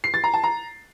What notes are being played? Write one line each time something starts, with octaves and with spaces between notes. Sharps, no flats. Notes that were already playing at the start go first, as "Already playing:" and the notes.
C7
A6
A#5
A5
A#5